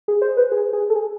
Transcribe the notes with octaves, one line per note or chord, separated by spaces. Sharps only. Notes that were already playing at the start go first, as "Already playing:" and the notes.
G#4
C5
B4
G#4
G#4
A4
G#4